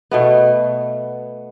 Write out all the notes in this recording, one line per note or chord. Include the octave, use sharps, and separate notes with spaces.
B2 A3 B3